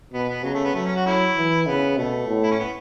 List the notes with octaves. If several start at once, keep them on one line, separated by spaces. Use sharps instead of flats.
B2 B3
B3
C#3 F#3
A3
B3
F#3 A3
C#4
F#4
A3 C#4 E4
E3
C#3 B3
B2 A3
A2
E4
C#4
B3